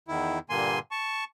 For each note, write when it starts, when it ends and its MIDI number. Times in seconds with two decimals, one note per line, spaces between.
0.08 0.39 40
0.08 0.39 51
0.08 0.39 64
0.50 0.79 43
0.50 0.79 46
0.50 0.79 50
0.50 0.79 58
0.50 0.79 80
0.50 0.79 84
0.91 1.24 81
0.91 1.24 85